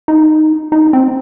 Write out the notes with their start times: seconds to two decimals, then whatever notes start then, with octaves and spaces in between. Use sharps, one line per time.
0.08 D#4
0.72 D#4
0.93 C4